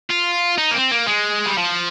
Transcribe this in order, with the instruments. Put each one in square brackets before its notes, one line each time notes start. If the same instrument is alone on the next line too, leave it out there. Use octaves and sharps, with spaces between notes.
[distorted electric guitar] F4
D#4
A#3
C4
A#3
G#3
G3
F3